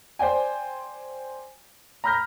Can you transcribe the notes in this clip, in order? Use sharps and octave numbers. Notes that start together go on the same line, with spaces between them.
C5 D5 G5 G#5
A#5 B5 F6 G6 A#6